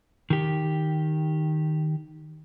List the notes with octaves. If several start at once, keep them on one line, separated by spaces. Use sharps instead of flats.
D#3 G4